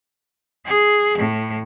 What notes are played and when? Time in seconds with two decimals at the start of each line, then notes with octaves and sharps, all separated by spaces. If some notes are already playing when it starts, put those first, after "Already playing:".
0.65 G#4
1.18 A2